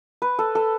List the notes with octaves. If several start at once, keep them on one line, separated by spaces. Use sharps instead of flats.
B4
A4
A4